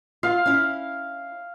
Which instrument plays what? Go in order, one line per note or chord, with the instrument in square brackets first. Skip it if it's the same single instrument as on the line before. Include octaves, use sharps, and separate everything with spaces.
[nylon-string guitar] F4 [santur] F5
[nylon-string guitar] C#4 E4